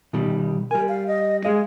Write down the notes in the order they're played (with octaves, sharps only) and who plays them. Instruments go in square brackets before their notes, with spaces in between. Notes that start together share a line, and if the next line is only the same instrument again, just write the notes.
[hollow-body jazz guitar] B2 D#3 G3
[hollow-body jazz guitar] G3 G#5 [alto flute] A#4
[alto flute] F5
D#5
[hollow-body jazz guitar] G#3 G#4 D#5 [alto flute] F5